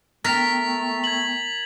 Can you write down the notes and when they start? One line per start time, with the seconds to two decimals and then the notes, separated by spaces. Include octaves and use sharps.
0.24 A3 B3 A#4 G5 A6 B6 F7
1.04 G#6 F#7